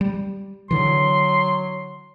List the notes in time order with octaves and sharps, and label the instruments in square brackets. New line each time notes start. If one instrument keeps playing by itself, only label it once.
[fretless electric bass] G3
[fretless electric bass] D3 E3 [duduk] F#3 [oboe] C6